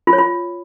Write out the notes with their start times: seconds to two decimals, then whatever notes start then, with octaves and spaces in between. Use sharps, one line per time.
0.07 F4
0.13 C#5
0.18 F4